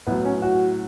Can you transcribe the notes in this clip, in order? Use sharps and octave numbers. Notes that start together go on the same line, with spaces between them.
A2 F#3 B3
C#4
F#4